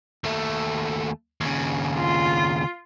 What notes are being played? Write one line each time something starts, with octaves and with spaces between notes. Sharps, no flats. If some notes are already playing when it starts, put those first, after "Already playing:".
D#2 A3
D#2 C#3
F4